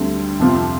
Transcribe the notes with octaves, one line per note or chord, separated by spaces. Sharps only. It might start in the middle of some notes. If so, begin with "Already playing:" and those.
Already playing: D2 D3 G3 C4
F2 C3 F3 C4 F4